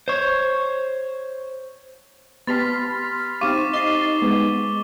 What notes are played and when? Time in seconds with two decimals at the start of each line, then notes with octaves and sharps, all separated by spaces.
0.08 C5 C#5
2.47 B3 G4 A5 B5 C6 F6 A6 B6
3.41 C4 D#4 G4 F5 C#6 D6 D#7
3.73 D#4 D#5 A6 C7 G7
4.22 G#3 B3